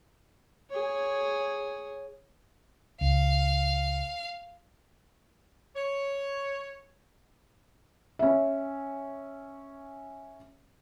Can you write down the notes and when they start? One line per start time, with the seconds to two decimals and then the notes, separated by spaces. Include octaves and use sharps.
0.70 G#4 C#5
3.01 C#2 F5
5.76 C#5
8.19 C#4 E5